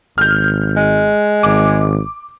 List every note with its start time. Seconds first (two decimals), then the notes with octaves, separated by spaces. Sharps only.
0.18 G#1 F6 G6
0.76 G#3
1.43 G#1 D6